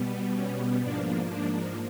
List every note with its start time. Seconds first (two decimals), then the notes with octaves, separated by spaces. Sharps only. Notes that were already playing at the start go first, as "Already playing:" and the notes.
Already playing: B2 G3 B3
0.35 C#4
0.82 G#2 F3 A#3 D4
1.29 D4